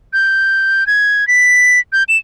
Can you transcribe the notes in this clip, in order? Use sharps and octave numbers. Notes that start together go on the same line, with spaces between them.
G6
G#6
B6
G6
E7